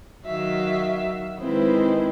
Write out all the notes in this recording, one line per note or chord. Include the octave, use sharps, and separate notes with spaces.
D#3 F#3 E5 F5
D#3 G#3 C4 E4 B4 C5